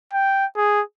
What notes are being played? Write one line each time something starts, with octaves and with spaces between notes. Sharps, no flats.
G5
G#4